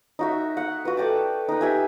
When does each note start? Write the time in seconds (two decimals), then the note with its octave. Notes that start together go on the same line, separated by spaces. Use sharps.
0.19 D#4 F#4 E5
0.57 F#5
0.85 F#4 B4
0.97 A4 D5 G5 A5
1.49 D#4 B4
1.61 G4 E5 G#5